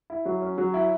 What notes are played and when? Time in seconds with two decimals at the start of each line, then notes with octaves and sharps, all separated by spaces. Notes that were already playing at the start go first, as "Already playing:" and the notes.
0.10 E4
0.25 F#3
0.42 C#4
0.58 F#3
0.74 E4